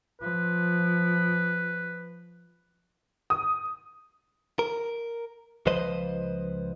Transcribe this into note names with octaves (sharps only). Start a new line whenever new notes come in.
F3 B4
D#6
A#4
C#2 F3 B4 C5 D#5 C6